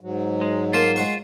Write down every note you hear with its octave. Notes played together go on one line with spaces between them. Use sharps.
G#2 F#3
G#3
A#3 F4 A#4 C5 A5
G#3 F#5 C#6